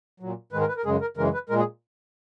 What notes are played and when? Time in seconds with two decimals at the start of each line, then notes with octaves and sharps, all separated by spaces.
0.20 A#2 F#3
0.52 G#2 D#3 G#3 B4
0.61 A#4
0.68 B4
0.77 A#4
0.85 F#2 C#3 G#3 G#4
1.01 A#4
1.17 F#2 C#3 E3 G#3 A#4
1.34 B4
1.49 A#2 G#3 A#4
1.58 G#4